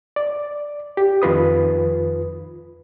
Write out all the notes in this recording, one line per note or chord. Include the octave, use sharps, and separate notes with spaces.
D5
G4
F2 D#3 F4 B4 D#6